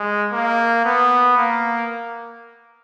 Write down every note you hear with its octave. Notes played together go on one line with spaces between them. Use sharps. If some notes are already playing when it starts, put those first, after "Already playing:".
Already playing: G#3
A#3
B3
A#3